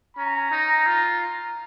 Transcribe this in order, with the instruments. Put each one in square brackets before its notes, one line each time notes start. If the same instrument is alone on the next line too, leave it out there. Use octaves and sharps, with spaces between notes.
[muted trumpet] C#4 [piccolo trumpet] A#5
[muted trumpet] D#4
F4